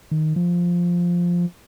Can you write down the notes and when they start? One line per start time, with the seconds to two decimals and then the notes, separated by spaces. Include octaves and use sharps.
0.11 D#3
0.36 F3